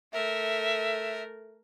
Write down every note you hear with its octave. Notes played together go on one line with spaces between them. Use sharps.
A3 A#4 E5